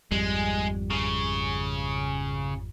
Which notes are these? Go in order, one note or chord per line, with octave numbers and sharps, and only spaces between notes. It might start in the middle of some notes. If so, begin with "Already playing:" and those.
G#1 F2 G3 G#3
C#3